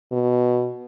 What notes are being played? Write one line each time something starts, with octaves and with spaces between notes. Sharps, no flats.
B2